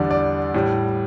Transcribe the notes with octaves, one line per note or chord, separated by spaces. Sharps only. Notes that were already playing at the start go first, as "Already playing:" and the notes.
Already playing: E2 D3 G3 D5
D5
A2 G3